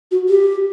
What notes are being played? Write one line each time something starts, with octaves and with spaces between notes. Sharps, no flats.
F#4
G4